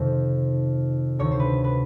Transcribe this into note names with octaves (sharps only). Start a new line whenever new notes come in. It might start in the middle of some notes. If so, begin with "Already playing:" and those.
Already playing: F2 C3 D#3 C5
D2 C3 D#3 C#5
C5
B4
B4